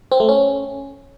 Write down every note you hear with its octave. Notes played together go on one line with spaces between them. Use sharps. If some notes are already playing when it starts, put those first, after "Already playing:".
C4
A3
C#4